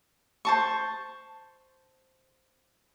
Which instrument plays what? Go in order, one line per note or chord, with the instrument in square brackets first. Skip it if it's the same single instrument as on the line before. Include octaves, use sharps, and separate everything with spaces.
[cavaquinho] C5 A5 C#6